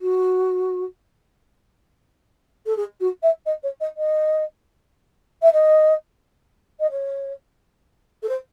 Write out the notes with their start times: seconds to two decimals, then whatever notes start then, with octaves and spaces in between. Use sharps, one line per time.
0.01 F#4
2.66 A4
2.76 G#4
3.00 F#4
3.22 E5
3.45 D#5
3.62 C#5
3.80 D#5
3.96 D#5
5.42 E5
5.52 D#5
6.80 D#5
6.90 C#5
8.22 A4
8.28 C5